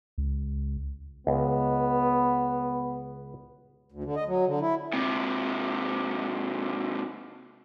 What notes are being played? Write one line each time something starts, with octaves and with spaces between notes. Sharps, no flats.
C#2
C#2 B3
D2
D3
D#5
F#3
D3
E4
G#2 C3